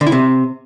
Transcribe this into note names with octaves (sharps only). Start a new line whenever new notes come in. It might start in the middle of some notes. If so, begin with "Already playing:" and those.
D3
E4
C3